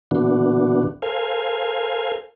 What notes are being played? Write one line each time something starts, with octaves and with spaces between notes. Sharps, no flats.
A#2 D3 E3 B3 D4 F#4
A4 A#4 C5 F5 G#5